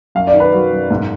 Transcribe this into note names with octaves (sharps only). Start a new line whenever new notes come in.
F#2 F5
D5
D#3
B4
F#3
F#2
G#2